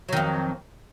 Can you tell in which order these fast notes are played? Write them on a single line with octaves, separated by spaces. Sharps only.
F#3 D#3 F2